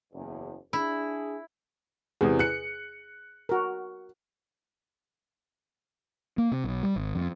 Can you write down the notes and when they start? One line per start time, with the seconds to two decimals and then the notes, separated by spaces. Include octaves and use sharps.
0.13 F#1 E2
0.73 D4 E4 G#4
2.21 E2 C3 G#4
2.39 F#6 C#7
3.49 F#4 A#4
6.38 A#3
6.52 C3
6.64 B1
6.83 G3
6.96 G#1
7.15 F2